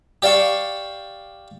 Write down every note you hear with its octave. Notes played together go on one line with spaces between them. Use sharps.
G4 D5 F5 A5 C#6